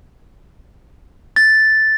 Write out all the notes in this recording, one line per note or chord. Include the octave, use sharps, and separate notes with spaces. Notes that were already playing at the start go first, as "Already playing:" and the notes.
A6